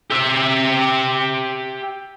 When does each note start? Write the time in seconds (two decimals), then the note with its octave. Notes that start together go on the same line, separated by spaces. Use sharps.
0.10 G4 E5